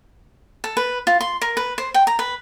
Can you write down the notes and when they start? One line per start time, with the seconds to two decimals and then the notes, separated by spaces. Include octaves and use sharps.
0.64 A4
0.77 B4
1.07 F4
1.21 C6
1.42 A#4
1.57 B4
1.78 C5
1.94 G5
2.07 A#5
2.19 B4